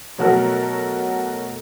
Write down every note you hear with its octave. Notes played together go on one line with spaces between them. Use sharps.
B2 F#3 A3 F#4 A4 A#4